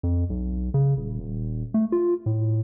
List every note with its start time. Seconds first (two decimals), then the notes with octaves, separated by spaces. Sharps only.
0.03 F2
0.30 B1
0.74 C#3
0.97 D#1
1.19 D#1
1.74 A3
1.92 F4
2.26 A2